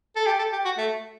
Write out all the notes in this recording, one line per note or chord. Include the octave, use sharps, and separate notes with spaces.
A4
G4
A4
G4
F#4
A3